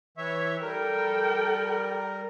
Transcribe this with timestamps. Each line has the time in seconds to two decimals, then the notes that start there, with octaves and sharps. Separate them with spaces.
0.18 E3 C#5 E5
0.62 G3 A4 A#4 G5